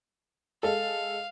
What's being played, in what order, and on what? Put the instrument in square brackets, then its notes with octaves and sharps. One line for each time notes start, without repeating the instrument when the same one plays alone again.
[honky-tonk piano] G#3 A4 [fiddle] F5